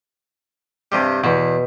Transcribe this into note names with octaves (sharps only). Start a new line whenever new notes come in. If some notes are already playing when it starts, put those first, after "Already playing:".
G2 C3 G3
E2 B2